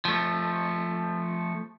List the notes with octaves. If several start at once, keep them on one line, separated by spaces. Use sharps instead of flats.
F3 A3